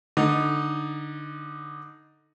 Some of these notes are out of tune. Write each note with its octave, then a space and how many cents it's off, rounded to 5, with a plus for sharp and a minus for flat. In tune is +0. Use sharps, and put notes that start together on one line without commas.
D3 +10 D#4 +0